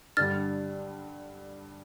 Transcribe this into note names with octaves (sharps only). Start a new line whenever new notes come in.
G2 D3 G3 F6 A6